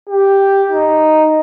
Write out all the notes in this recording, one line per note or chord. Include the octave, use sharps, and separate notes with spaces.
G4
D#4